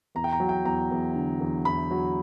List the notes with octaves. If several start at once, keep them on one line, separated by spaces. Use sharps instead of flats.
E2 A#5
G5
A#5
F#3
G5
E2 A#5
E2
D3
E2
E2 B5
F#3